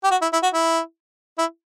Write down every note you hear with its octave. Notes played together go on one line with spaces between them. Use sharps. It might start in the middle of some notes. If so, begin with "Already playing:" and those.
G4
F#4
E4
E4
F#4
E4
E4